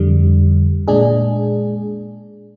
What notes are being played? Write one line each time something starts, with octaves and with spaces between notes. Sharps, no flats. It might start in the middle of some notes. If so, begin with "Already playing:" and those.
Already playing: F2 D3 G3
A#2 G#3 D4 G#4